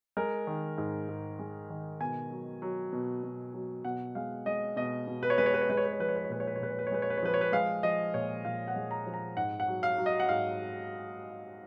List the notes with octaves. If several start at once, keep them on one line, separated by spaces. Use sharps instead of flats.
G#3 A#4
D#3
G#2
G#2
G#3
D#3
B2 G#5
F#3
F#3
B2
B2
F#3
B2 F#5
G#3 F5
G#3 D#5
B2 D#5
B2
B4
C#5
G#3 B4
C#5
B4
C#5
G#3 B4
C#5
B4
C#5
F3 B4
C#5
B4
C#5
A#2 B4
C#5
B4
C#5
A#2 B4
C#5
B4
C#5
G#3 B4
C#5
B4
C#5
F3 B4
C#5
B4
G#3 F5
F3 D#5
A#2 C#5
A#2 F5
F#5
G#3
A#5
F3
A#5
G#2 F#5
F#5
F#3
F5
F#3
D#5
F#5
G#2 F5